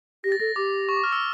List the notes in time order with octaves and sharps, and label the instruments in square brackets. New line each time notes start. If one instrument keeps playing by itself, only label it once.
[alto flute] G4 [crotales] A#6
[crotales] A6
[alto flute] A4 [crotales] A#6
[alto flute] G4 [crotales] D6
[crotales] C#6
D6
F6
E6